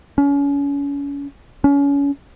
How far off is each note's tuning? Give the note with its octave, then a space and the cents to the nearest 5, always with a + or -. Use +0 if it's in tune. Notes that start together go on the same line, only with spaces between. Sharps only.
C#4 +35
C#4 +30